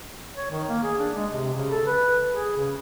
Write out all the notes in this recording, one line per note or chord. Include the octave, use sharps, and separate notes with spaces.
C#5
D#3
A#3
G#4
D4
G#3
C3
C#3
A4
B4
G#4
C#3